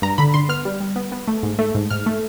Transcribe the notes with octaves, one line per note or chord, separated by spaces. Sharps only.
G2 A#5
D3 B5
D3 C6
B3 F6
G3
G3
B3
B3
A3
G#2
A3
G#2
G#2 F6
A3